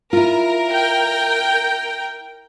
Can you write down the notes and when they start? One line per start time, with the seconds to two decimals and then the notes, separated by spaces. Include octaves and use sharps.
0.13 E4 F4 A#4
0.70 G5